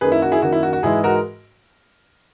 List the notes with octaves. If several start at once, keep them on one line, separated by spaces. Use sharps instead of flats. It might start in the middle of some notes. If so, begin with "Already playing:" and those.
F#2 D#3 A#3 G#4 B4
E4
F#4
E4 G#4
F#2 D#3 A#3 F#4
E4
F#4
F#4
G#2 E3 G#3 E4 G#4
F#4 A#4